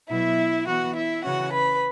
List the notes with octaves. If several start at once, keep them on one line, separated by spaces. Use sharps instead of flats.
B2 F#3 B3 E4 E5
E3 B3 F#4 F#5
E4 E5
C#3 E3 C#4 F#4 F#5
B4 B5